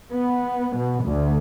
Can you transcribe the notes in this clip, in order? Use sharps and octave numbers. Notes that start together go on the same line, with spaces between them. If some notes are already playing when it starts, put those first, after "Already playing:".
B3
B2
D2